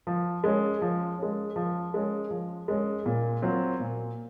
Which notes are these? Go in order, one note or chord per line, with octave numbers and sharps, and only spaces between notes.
F3
G#3 C#4
F3
G#3 C#4
F3
G#3 C#4
F3
G#3 C#4
A#2
F#3 C4 F4
A#2